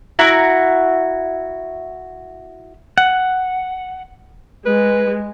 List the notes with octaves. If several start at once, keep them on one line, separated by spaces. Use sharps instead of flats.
E4 F#4 A#5
F#5
G#3 B4